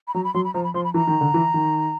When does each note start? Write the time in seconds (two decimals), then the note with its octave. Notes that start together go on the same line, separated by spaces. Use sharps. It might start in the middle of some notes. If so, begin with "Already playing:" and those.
0.08 B5
0.14 F#3 A#5
0.24 B5
0.34 F#3 C6
0.44 B5
0.54 F3 A#5
0.64 B5
0.74 F3 C6
0.84 B5
0.94 E3 A#5
1.07 D#3
1.21 D3
1.34 E3
1.54 D#3